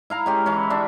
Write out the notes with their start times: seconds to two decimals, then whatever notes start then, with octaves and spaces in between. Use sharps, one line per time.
0.10 E4 F5 A#5
0.26 G#3 C#4 G4
0.46 E3 C#4
0.70 D4 E5